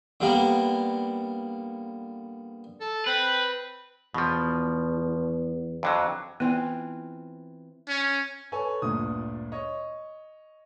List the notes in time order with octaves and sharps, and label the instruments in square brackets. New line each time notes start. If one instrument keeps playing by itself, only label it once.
[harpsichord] D3 G3 A#3 B3
[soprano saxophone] A4
[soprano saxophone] C4 [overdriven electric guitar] B4
[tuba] E2 [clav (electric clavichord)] B2 F3
[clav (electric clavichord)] F2 D3 F#3
[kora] E3 C4 F4 [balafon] B3
[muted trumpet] C#4
[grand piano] A4 B4 C#5 G#5
G1 D2 A#2 D#6
C#5 D#5